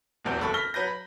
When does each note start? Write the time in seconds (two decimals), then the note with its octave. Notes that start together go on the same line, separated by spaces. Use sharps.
0.25 D#1 B1 E2 C4 G6
0.39 F#1 D#2 A4 B5 C#6
0.54 F6 A#6 B6 G7
0.74 F#3 B4 G6 A#6
0.87 B5